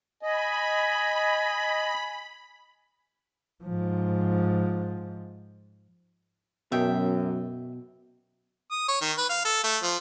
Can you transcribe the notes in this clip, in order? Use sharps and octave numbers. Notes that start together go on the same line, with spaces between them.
D#5 G#5 B5
G#2 F3
F#2 B2 E5 G5
D#6
C#5
D#3
B4
F5
A4
A3
F3